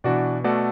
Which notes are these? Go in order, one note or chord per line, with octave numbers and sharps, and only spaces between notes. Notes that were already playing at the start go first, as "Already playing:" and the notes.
B2 E3 D4 F#4 D5
B2 A3 F#4 A4 D5